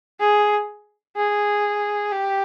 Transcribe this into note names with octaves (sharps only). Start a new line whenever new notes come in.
G#4
G#4
G4